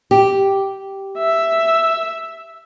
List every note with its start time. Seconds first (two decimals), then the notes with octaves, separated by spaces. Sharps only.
0.11 G4
1.18 E5